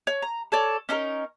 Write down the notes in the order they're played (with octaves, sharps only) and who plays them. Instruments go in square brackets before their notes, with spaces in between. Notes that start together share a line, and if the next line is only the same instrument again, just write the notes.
[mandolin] C#5
A#5
A4 C#5 D5
C#4 D#4 A4 A#4